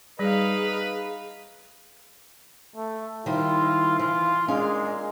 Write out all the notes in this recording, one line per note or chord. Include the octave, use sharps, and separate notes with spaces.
G3 D#4 G#4 B4 F5
A3
D#3 G3 E4 F4 C5
E3 F4
A#2 G#3 C#4 D4 F5